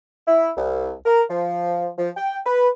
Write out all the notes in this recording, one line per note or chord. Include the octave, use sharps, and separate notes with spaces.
E4
C2
A#4
F3
F3
G5
B4